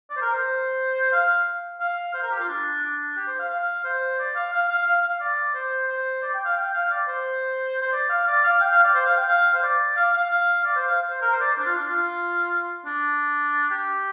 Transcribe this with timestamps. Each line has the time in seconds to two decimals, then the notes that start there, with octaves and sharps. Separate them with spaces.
0.10 D5
0.17 C5
0.22 A#4
0.33 C5
1.12 F5
1.80 F5
2.14 C5
2.23 A#4
2.31 G4
2.40 F4
2.48 D4
2.82 D4
3.16 G4
3.27 C5
3.39 F5
3.50 F5
3.84 C5
4.19 D5
4.35 F5
4.53 F5
4.69 F5
4.87 F5
5.03 F5
5.20 D5
5.54 C5
5.88 C5
6.22 D5
6.34 G5
6.45 F5
6.57 G5
6.73 F5
6.91 D5
7.07 C5
7.81 C5
7.92 D5
8.09 F5
8.27 D5
8.44 F5
8.61 G5
8.72 F5
8.83 D5
8.94 C5
9.06 F5
9.17 G5
9.28 F5
9.54 C5
9.63 D5
9.96 F5
10.13 F5
10.31 F5
10.65 D5
10.76 C5
10.87 F5
11.10 C5
11.22 A#4
11.33 C5
11.41 D5
11.50 C5
11.58 D4
11.66 F4
11.78 D4
11.89 F4
12.86 D4
13.70 G4